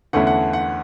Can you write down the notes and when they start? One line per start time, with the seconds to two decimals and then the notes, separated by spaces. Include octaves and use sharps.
0.13 E2 D3 A3 C#4 E4 F#5
0.27 F#5
0.53 F#5